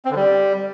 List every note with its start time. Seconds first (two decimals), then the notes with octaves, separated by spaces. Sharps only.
0.05 C4
0.10 D3
0.16 G3